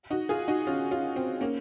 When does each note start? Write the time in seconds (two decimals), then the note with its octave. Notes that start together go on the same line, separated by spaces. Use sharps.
0.10 D#4 F#4
0.29 F4 G#4
0.48 D#4 F#4
0.67 C#4 F4
0.91 C#4 F4
1.16 C4
1.41 A#3 C#4